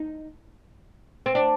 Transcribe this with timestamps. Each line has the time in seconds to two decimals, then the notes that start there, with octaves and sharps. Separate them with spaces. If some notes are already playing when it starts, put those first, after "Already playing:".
Already playing: D#4
1.26 C4
1.35 D4